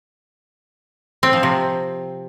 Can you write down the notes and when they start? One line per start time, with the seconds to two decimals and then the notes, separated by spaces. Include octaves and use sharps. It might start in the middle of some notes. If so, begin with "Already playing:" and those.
1.23 C4
1.33 F3
1.43 C3